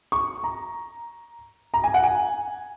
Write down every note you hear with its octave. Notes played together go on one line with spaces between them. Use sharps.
C#6
A#5
A#5
G#5
F#5
G#5